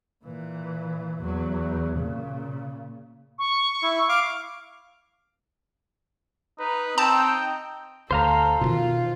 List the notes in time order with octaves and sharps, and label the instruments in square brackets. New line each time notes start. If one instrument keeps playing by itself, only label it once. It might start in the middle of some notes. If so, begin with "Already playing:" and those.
[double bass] A#2 E3
E2 F#3
A#2 C#3
[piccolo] C#6
[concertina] E4
F5 D6
[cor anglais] D#4 [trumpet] B4
[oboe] C4 [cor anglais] D#4 [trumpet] G5 [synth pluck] A5
[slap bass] D2 [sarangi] A4 [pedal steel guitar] C5 F5 A#5
[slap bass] B2 D3 D#3 [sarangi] F4